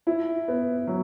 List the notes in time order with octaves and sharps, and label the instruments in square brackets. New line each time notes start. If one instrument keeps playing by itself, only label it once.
[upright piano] E4
B3
F#3